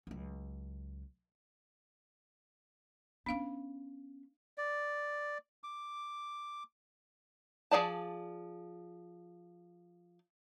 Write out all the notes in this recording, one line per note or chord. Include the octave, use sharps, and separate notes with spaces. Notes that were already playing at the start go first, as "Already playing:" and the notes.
C#2 F#3
B3 C#4 D4 F5
D5
D6
F3 G#4 D5 A5